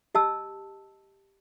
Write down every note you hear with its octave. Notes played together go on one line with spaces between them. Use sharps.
G4 D#5 A5 E6